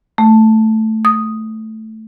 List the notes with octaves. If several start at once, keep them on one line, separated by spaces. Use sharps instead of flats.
A3
D#6